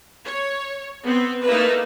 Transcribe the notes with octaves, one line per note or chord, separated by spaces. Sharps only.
C#5
B3 C4
A3 A#3 D#4 E4 A#4 B4